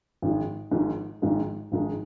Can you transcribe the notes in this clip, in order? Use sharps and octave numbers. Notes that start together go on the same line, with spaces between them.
G#1 G#2 F3 G#3
G#1 G#2 F3 G#3
G#1 G#2 F3 G#3
G#1 G#2 F3 G#3